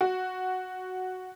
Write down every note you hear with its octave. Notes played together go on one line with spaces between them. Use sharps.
F#4